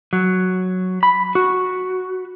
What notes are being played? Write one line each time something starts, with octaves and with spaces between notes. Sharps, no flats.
F#3
B5
F#4